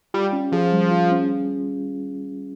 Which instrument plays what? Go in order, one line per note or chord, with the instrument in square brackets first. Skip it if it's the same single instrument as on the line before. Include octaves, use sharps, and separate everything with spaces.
[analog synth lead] G3 [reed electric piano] F4
[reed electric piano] C#4
[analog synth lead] F3 [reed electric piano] G#4
[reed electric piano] G3
F4
C#4